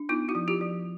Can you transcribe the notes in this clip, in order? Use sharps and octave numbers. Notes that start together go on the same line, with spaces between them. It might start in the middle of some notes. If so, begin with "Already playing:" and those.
Already playing: D4
B3 D#4 F4
E4 F#4
F3
F4 G4
F3